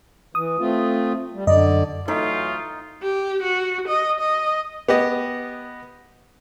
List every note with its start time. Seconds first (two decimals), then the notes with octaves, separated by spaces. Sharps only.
0.35 E3 D#6
0.59 A3 C4 F4
1.34 G3
1.47 F#2 D3 D5 D#5
2.08 E3 F#3 A3 D#4 F4
3.02 G4
3.43 F#4
3.88 D#5
4.20 D#5
4.88 B3 G4 D#5